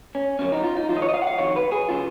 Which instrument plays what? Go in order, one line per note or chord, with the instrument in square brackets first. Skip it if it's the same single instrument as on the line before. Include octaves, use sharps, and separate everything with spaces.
[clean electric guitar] C#4
F2 C#3 F#3 C#4
D#4
F4
D#4
F2 D#3 F#3 F4
D#5
C#5
D#5
F5
F#5
F5
F2 D#3 F#3 C#5
B4
G#4
C#3 F#3 F4